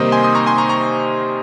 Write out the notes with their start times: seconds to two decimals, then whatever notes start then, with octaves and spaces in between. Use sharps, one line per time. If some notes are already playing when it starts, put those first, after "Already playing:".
Already playing: C3 D#3 G3 A#3 D#4 C5 D#5
0.12 G#5 C6
0.23 C6 D#6
0.35 A#5 C#6
0.46 G#5 C6
0.58 A#5 C#6
0.69 A#5 C#6